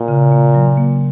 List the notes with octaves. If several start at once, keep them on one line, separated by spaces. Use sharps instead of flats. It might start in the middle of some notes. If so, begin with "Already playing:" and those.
Already playing: A#2
C#3
A#3
F#3
A#3